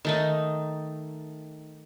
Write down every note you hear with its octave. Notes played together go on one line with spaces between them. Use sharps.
D#3 A3 D#4